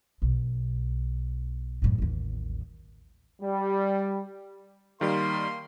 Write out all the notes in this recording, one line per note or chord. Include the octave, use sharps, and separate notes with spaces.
B1
F#2 A2
A1 D#2
G3
D#3 G3 A#3 C6